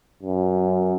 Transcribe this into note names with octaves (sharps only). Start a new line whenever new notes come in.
F#2